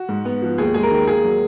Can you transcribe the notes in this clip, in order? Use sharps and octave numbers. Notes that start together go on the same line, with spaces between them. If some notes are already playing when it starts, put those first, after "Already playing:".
Already playing: F#4
G#2
B3
F3
D#2 G#4
G#3 G#4
A#4
D#3
A#3 G#4
F#3